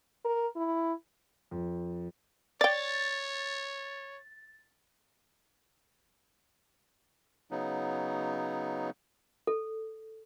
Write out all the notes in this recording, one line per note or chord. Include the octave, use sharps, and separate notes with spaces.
A#4
E4
F2
C#5 D5 G5 A6
C#3 F#3 B3 D#4
A4